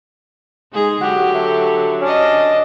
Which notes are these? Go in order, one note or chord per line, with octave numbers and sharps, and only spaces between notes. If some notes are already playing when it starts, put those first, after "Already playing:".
G#3 D#4 G#4
D3 F#3 F#4 G4
A3
C#4 D4 D#5